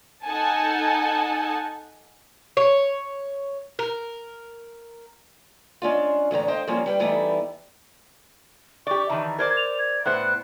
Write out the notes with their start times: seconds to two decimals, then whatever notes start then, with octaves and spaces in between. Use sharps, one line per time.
0.24 D#4 A4 F#5 G#5 A5
2.57 C#5
3.79 A#4
5.82 G#3 C#4 D4 F4
6.31 E2 A2 D3 A#5
6.48 C5 D#5 F5 G5
6.67 F3 G3 A#3 C4 C#4 F4
6.86 G3 B4 G5
7.00 E3 G3 A3 B3 D#4 E4
8.87 G4 D5 C#6
9.10 D#3 E3 A5
9.39 A#4 C5 D5 G#6
9.57 F7
9.79 G#6
10.05 A2 B3 C5 F#6